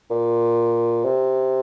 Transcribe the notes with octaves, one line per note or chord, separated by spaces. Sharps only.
A#2
C3